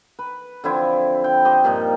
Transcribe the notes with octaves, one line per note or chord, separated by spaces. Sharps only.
B4
D3 F3 C4 E4
G5
G4 C5 D#5
G2 A#2 F3 D#4